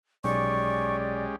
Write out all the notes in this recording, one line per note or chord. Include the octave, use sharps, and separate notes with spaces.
B1 G#3 C#4 G4 D5 C#6